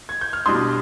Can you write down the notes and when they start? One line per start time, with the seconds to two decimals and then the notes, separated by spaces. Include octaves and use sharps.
0.09 G#6
0.21 G6
0.33 F6
0.46 B2 G3 D4 C6 D#6